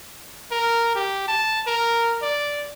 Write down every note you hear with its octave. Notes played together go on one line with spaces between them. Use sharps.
A#4
G4
A5
A#4
D5